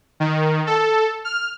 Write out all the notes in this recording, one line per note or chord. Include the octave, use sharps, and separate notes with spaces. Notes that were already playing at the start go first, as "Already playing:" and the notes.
D#3
A4
F6